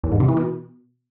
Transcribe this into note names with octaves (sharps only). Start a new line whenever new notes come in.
E2
G#2
C3
E3
B2